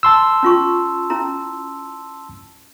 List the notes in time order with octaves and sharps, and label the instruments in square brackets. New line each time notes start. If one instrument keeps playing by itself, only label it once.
[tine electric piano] A5 C6 E6
[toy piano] C#4 F4 C#6
C#4 E4 A#5